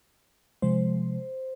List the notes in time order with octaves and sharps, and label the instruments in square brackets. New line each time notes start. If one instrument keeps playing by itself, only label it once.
[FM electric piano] C3 F3 G#3 C5